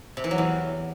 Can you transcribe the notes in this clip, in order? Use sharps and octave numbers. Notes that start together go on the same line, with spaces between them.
C3
E3
F#3
E2